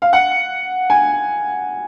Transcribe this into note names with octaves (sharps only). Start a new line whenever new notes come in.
F5
F#5
G#5